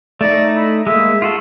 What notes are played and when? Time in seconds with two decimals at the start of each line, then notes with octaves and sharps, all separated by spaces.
0.21 A3 D#4 D5
0.55 E4
0.87 G#3 A#3 E5
1.22 F4 F#4 A4